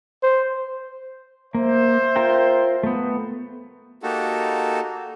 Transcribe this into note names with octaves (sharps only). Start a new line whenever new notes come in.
C5
A#3 C5 E5
F4 A#4 G5
A3 B3
A#3 D#4 F#4 G4 A4